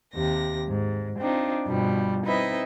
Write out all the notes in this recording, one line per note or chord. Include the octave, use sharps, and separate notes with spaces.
D#2 C3 A#6
G#2
C4 D4 D#4 F4
G2 B2 F3 G3
C4 D#4 E4 B4 D#5 E5